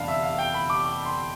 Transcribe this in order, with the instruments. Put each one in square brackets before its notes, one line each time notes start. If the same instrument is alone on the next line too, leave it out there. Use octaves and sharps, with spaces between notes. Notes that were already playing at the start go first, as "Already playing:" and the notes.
Already playing: [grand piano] F1 E2 D3 G3 D4 F5 A5 B5
E5
F5
G5
B5
D6
D6
C6